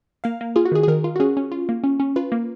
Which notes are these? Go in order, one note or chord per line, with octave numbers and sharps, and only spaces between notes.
A#3 F5
A#3
F4 G#4
F#4
D#3 G#4
G#4
D#3 A#4
F4
F#4
C#4 G#4
C#4
F4
A#3
C#4
C#4
F4 B4
A#3